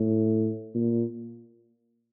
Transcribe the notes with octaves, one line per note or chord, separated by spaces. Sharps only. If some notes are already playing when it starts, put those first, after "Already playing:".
Already playing: A2
A#2